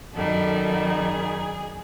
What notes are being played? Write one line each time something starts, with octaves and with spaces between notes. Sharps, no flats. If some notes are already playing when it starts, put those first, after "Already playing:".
F#2 D#3 G3 A4
G#4